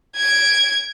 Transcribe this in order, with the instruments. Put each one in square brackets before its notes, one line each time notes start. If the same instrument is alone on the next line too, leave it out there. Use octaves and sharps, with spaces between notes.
[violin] G#6 D7